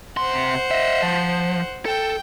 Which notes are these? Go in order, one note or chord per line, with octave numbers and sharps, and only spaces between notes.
C3 C5 F#5 C6
D#5 E5
F3
A4 G5